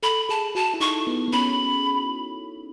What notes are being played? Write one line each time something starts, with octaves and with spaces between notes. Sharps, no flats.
A4 B5
G#4 A5
F#4 A5
E4
D#4 C#6
B3
B3
C#4 B5